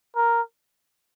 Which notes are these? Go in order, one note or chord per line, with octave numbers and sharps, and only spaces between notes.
A#4